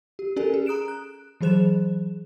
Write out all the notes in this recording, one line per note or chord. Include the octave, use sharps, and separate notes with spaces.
G4
C#4 G4 A4 A#4 D5 G#5
G#4
A#5 D#6 F#6 D7 E7
F#6
E3 F#3 G#4 C5 F#6 E7